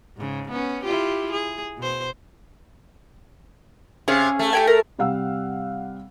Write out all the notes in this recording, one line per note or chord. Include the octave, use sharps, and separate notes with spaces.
G#2 C#3
B3 C#4
E4 F4 G4
G#4
B2 C5
C3 C#4 G#4 F5
A3
G4 G5 G#5
A#4
C3 G3 F5 F#5 E6